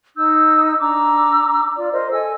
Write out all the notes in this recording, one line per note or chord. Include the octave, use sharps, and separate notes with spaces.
D#4 E6 G6
D4 A#5 D6 E6
F4 D5
A#4 C5 D#5
A4 D#5 G#5 E6